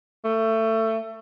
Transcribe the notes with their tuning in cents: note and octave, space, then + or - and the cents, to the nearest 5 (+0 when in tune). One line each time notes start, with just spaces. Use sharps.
A3 +25